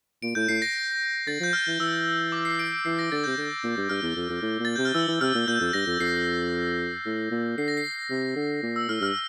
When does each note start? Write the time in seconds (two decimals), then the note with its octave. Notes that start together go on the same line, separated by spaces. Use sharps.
0.22 A#2 D7
0.35 A2 G6
0.48 A2 C7
0.62 A#6
1.27 D3 A6
1.40 F3 G6
1.53 F6
1.67 E3
1.80 E3 E6
2.32 D6
2.45 C7
2.59 D7
2.72 D7
2.85 E3 C7
2.99 A#6
3.12 D3 A6
3.24 C3 G6
3.37 D3
3.64 A#2
3.78 G2
3.89 G2 F6
4.03 E2
4.16 F2
4.29 F2
4.42 A2
4.59 A#2
4.65 A6
4.76 C3 G6
4.85 F6
4.95 E3 E6
5.08 E3
5.21 C3 F6
5.35 A#2
5.48 A#2 G6
5.61 F2
5.73 G2 A#6
5.86 F2
6.00 F2 C7
7.06 A2
7.31 A#2
7.58 D3 C7
7.68 A#6
7.77 C7
8.10 C3
8.36 D3
8.63 A#2
8.76 E6
8.89 A2 F6
9.00 G2 F6